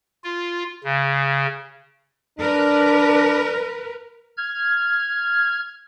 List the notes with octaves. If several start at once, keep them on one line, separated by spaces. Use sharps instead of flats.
F4
C#3
D4 A#4 B4
F6 G#6